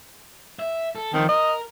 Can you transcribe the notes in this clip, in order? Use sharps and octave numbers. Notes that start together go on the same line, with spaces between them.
E5
A4
D#3 F3 C4
A#4 D#5